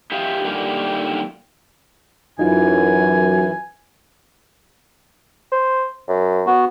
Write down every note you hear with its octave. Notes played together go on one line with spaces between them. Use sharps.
E4 G4 D#5 F5
D3 D#3 G3 A#3 D#4
F#2 E3 D#4 F4 G#5
C5
F#2
B3 F#4